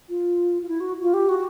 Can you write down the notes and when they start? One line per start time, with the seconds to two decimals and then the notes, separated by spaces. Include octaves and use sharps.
0.09 F4
0.62 F4
0.69 E4
0.80 F#4
1.02 F4
1.14 G4
1.29 F#4